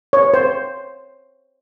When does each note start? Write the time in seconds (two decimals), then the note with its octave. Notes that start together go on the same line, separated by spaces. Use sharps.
0.13 C#5
0.34 C5